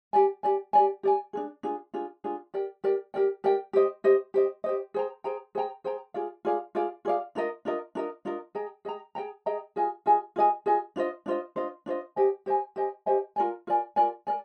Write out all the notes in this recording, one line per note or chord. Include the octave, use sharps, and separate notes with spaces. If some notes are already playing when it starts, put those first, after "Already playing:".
G4 D5 G#5
G4 D5 G#5
G4 D5 G#5
G4 D5 G#5
D4 F4 G#4
D4 F4 G#4
D4 F4 G#4
D4 F4 G#4
G4 A#4 D5 G5
G4 A#4 D5 G5
G4 A#4 D5 G5
G4 A#4 D5 G5
G4 C5 D#5
G4 C5 D#5
G4 C5 D#5
G4 C5 D#5
G#4 C5 G5 A#5
G#4 C5 G5 A#5
G#4 C5 G5 A#5
G#4 C5 G5 A#5
F4 G#4 D5 F5
F4 G#4 D5 F5
F4 G#4 D5 F5
F4 G#4 D5 F5
D4 F4 A#4 D#5
D4 F4 A#4 D#5
D4 F4 A#4 D#5
D4 F4 A#4 D#5
G#4 D#5 G5 A#5
G#4 D#5 G5 A#5
G#4 D#5 G5 A#5
G#4 D#5 G5 A#5
F4 G#4 D#5 G#5
F4 G#4 D#5 G#5
F4 G#4 D#5 G#5
F4 G#4 D#5 G#5
D4 F4 C5 D#5
D4 F4 C5 D#5
D4 F4 C5 D#5
D4 F4 C5 D#5
G4 C5 D#5 G#5
G4 C5 D#5 G#5
G4 C5 D#5 G#5
G4 C5 D#5 G#5
F4 A#4 D5 G#5
F4 A#4 D5 G#5
F4 A#4 D5 G#5
A#4 D5 G#5